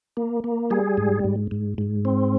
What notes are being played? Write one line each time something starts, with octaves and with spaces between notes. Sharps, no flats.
A#3
A#3
G3 G#4
G#2
G#2
G#2
G#2
C4